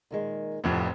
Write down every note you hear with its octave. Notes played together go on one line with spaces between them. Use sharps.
A#2 D#3 G#3
F1 F2 A2 D3 F3 B3